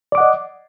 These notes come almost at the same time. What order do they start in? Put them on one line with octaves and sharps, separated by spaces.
D5 D6 F#5 D#5